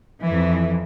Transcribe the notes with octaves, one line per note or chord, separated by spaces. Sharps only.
F2 E3